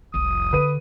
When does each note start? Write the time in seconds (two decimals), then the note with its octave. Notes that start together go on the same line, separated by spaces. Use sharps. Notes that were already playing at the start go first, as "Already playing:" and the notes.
0.14 F1 C2 D#6
0.53 D3 B4 D#7